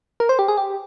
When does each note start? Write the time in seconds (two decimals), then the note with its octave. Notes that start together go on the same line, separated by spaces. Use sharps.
0.20 A#4
0.29 C5
0.39 G4
0.48 G#4
0.58 G4